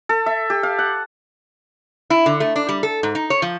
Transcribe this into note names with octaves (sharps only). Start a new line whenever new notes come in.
A4
E5
G4
F5
F#5
E4
D3
A3
D4
G3
A4
G#2
D#4
C#5
F3